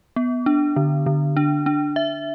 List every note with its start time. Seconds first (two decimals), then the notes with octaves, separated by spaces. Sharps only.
0.16 B3
0.46 D4
0.76 D3
1.06 D3
1.37 D4
1.66 D4
1.96 E5